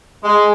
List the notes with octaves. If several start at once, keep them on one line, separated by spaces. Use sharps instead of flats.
G#3